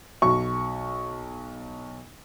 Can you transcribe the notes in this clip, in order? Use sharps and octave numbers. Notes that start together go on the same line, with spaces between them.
B1 C#6